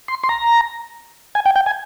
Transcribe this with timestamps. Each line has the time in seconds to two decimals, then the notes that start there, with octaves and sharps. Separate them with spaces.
0.08 C6
0.23 C6
0.29 A#5
1.35 G#5
1.45 G5
1.56 G5
1.66 G#5